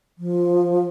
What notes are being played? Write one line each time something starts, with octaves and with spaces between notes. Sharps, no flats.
F3